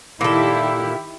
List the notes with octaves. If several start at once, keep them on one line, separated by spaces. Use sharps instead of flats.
A#2 D#3 E4 G4 A4